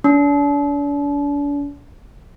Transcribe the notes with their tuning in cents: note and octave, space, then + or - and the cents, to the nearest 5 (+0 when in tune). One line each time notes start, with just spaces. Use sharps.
D4 -40